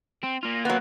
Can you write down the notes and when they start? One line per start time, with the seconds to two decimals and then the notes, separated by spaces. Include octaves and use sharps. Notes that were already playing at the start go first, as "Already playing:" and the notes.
0.23 C4
0.43 A#3 F4
0.65 F#3 B3